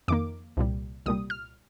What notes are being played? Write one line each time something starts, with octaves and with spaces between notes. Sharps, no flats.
F2 D#3 A#3 D6
C2 A#2 G3
C2 A#2 G3 D#6
F6